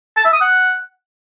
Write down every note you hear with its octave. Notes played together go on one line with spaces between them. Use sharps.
A5
E5
D#6
F#5